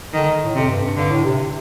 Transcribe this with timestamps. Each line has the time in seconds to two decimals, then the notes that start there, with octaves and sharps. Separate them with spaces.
0.13 D3 D#3
0.42 A2
0.55 F2 C3
0.69 G2
0.83 G2
0.96 G2 D3
1.10 A2
1.24 C3